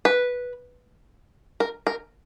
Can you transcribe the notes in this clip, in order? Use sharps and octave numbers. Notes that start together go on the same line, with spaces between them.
B4
A#4
A#4